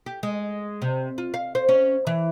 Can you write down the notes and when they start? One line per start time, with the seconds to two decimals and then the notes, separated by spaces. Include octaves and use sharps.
0.06 G4
0.23 G#3
0.82 C3
1.18 F4
1.34 F5
1.55 C5
1.69 C#4
2.07 E3